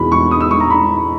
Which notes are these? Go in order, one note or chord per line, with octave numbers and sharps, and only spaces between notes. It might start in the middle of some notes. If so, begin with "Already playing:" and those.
Already playing: E2 B2 G#3 B5
C#6
D#6
E6
C#6
A#5
B5